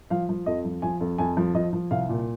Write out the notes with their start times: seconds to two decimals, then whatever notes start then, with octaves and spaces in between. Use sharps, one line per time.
0.10 F3 F5
0.29 F3
0.46 F2 D#5
0.65 F3
0.82 F3 G#5
1.01 F2
1.18 F2 G#5
1.37 F3
1.55 F3 D#5
1.73 F3
1.91 C2 F5
2.09 A#2